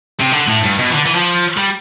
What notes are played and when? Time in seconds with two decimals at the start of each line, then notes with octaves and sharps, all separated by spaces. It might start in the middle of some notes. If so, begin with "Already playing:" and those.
0.20 C3
0.32 D3
0.48 A2
0.64 G2
0.79 B2
0.90 E3
0.94 D3
1.06 E3
1.15 F3
1.57 G3